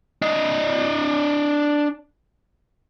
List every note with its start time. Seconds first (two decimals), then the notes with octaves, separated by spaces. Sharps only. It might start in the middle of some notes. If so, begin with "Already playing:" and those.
0.22 D4 D#5